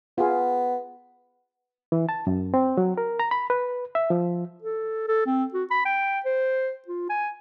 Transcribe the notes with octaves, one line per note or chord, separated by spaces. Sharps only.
B3 F4 G#4
E3
A5
F#2
C4
F#3
A#4
A#5
B5
B4
E5
F3
A4
A4
C4
F#4
B5
G5
C5
F4
G#5